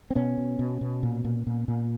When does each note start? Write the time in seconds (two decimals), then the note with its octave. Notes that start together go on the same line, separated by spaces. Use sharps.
0.10 C4
0.15 B2 B3 C#4
0.38 B2
0.59 B2
0.81 B2
1.03 A#2
1.25 A#2
1.47 A#2
1.68 A#2